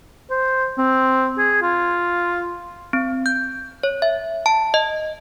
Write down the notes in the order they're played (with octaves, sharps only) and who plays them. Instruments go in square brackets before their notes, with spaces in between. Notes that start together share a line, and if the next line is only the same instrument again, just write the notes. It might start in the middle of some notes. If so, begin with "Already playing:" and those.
[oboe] C5
C4
G#4
F4
[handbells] C4
G6
C#5
E5
A5
D#5